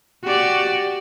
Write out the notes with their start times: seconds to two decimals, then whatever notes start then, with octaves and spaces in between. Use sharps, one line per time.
0.24 F#4 G4 D5